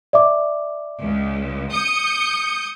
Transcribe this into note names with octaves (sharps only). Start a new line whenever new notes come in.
D5 E5 D6
C#2
D#6 G6 C#7